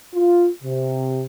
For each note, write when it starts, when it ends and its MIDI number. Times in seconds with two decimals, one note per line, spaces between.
0.14 0.48 65
0.63 1.24 48